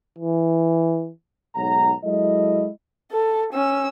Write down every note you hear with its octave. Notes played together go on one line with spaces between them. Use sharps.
E3
B1 G#2 C#5 F#5 A#5
F#3 G#3 E4 A4 D#5
A4
C#4 E6